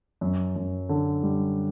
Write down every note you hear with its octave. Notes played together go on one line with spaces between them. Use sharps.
F#2
F#2
D3
G3